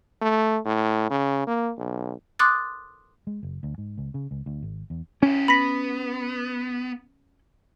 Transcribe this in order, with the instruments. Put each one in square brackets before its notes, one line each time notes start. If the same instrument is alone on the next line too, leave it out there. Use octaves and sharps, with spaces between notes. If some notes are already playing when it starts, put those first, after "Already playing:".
[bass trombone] A3
A2
C#3
A#3
B1
[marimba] C6 D6 D#6 F#6 A6
[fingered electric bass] G#3
F#1
D2
G#2
C#2
C#3
C#2
D2
G#1
E2
[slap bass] C#4 [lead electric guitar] E4 G4
[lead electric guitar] B3 [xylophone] B5 A#6 B6